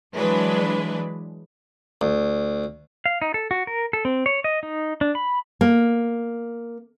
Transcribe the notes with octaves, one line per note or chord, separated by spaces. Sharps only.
E3 F#3 G#3 D4 B4
D2
F5
D#4
A4
F#4
A#4
A4
C4
C#5
D#5
D#4
D4
B5
A#3